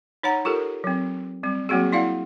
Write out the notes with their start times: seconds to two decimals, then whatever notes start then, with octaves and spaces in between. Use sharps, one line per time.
0.23 D#4 C#5 F#5 A#5
0.45 F4 G4 A4 A#4
0.84 F#3 C4
1.43 G3 C4
1.69 F#3 A#3 C4 F#4 G#4
1.92 E4 D5 F5 F#5